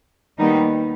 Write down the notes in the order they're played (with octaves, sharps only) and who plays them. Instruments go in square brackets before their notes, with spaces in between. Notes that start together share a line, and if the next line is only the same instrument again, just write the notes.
[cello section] D#2 D#3 G3 B3 D#4